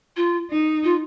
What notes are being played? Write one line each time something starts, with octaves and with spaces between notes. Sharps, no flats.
F4
D#4
F4